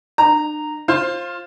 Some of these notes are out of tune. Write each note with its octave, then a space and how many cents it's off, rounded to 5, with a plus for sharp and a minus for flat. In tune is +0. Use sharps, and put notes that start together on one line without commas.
D4 +45 A#5 -10
F4 +0 C5 +25